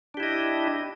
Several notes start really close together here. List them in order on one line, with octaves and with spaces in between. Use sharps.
D4 G4 E4 D#5